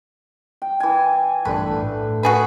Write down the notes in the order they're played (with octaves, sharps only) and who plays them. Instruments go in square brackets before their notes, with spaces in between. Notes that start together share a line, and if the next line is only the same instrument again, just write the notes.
[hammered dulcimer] G5
E3 G#5
[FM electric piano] A#1 G2 E3 [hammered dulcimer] D3 A3 [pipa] B4
[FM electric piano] A2
[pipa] F#4 G#4 B4